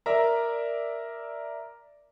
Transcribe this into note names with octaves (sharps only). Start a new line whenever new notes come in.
A#4 D5 E5 A#5